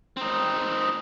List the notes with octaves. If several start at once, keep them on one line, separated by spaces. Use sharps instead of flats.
C4 D#4